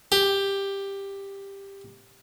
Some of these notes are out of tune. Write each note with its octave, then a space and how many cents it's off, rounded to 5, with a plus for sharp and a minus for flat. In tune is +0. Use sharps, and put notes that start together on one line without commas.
G4 +10